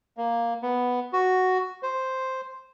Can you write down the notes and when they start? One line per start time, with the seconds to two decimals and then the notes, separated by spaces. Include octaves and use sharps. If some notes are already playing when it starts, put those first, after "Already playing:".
0.17 A#3
0.63 B3
1.13 F#4
1.83 C5